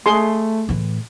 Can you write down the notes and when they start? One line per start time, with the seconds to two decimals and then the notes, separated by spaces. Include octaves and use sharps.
0.06 A3 G#4 C6
0.69 A2 E3